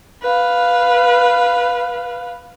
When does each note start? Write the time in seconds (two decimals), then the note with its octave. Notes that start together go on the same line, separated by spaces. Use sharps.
0.22 B4 F5